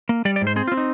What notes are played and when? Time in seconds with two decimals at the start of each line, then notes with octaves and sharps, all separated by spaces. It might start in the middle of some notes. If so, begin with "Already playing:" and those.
0.09 A#3
0.25 G3 D5
0.36 D5
0.42 G#2
0.47 C5
0.56 C4 G#4
0.68 F4
0.72 C4
0.77 D#4